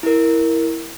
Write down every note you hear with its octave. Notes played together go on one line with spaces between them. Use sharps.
E4 A#4